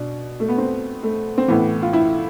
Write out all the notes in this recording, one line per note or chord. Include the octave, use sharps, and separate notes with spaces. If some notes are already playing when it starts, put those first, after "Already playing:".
Already playing: B2 D4
A3
B3
C4
A3
C4
A2 E3 B3
F4
E4